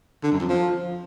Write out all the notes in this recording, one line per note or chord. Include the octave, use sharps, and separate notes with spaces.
D3
F#2
F2
F3